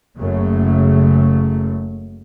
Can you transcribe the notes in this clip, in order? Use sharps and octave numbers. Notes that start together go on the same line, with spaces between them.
F#1 F#2 C#3 A3